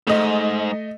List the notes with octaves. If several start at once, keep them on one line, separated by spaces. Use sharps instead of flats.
C#2 G#2 A3 D#5